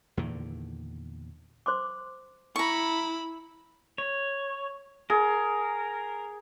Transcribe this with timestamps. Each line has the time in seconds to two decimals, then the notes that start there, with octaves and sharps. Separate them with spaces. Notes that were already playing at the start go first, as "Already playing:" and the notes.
0.17 E2 A#2 D3 D#3
1.66 C5 C6 D6
2.56 E4 A#5 B5 C#6
3.98 C#5
5.10 G#4 A#4